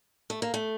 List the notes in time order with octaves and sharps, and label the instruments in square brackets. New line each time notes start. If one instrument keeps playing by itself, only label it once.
[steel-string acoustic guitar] A3
A#3
A3